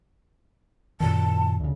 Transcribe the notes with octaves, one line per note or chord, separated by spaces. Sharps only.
F#2 A#2 D#3 A5
D2 C#3